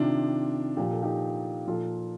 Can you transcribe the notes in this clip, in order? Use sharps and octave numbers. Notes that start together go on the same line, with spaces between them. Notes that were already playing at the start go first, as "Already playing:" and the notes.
Already playing: C3 D#3 D4 F4
A#2 F3 G4
A4
D#4 G4
A#2 F3 F4 A4